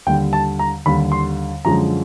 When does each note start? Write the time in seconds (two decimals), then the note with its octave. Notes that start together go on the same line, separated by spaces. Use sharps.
0.06 D#2 D3 G3 G5
0.33 A5
0.59 A#5
0.86 D#2 D3 G3 B5
1.12 C6
1.65 F#2 D3 F3 G#3 A#5